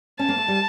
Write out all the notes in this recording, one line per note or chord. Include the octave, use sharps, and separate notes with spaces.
C#4 A5
A#3
A3
G3